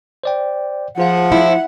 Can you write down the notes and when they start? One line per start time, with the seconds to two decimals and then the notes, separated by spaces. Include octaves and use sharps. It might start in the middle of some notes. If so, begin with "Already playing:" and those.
0.24 C5 D5 G5
0.98 F3 F4 G#4 F5 F#5
1.32 E4